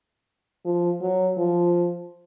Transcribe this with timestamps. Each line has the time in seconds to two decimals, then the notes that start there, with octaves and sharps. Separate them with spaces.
0.65 F3
1.01 F#3
1.37 F3